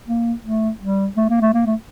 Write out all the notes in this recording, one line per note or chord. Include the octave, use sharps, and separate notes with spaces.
A#3
A3
G3
A3
A#3
A3
A#3
A3